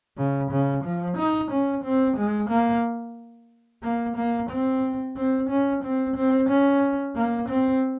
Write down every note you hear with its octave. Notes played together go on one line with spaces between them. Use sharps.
C#3
C#3
F3
D#4
C#4
C4
G#3
A#3
A#3
A#3
C4
C4
C#4
C4
C4
C#4
A#3
C4